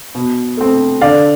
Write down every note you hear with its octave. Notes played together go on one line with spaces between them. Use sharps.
B2
A3 C4
D3 D5 F5